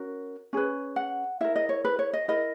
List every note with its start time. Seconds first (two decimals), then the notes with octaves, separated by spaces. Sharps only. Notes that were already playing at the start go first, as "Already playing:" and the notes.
Already playing: C#4 F#4 A#4
0.53 C#4 G#4 B4
0.96 F#5
1.41 E4 A#4 E5
1.56 D#5
1.69 C#5
1.85 B4
1.99 C#5
2.13 D#5
2.28 E4 A#4 D#5